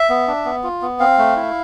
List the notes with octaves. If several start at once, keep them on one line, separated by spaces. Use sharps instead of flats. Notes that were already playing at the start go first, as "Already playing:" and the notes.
Already playing: E5
B3
D4
B3
F4
B3
C4 F5
A3
E4